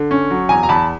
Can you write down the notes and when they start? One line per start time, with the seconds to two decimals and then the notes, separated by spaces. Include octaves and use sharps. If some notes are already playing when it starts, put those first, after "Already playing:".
Already playing: D3
0.11 C#4
0.31 F#3
0.49 E2 G#5 A#5
0.63 A#5
0.69 E2 A5 B5